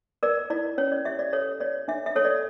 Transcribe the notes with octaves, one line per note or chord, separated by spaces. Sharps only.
A#4 D5
E4 D5
C#4 C#5
D5
G4 E5
D5
A4 C#5
C#5 D5
D4 E5
E5
A4 C#5
D5